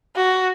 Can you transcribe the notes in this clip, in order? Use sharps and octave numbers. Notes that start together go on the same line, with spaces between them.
F#4